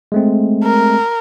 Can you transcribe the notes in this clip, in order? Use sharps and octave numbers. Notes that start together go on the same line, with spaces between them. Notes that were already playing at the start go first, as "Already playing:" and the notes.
G#3 A3 C4
A#4